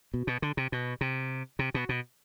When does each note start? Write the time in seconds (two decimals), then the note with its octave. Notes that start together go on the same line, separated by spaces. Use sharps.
0.14 B2
0.27 B2
0.42 D3
0.57 C3
0.72 B2
1.01 C3
1.59 C3
1.74 B2
1.89 B2